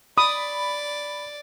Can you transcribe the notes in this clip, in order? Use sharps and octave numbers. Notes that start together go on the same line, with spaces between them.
D5 B5 D#6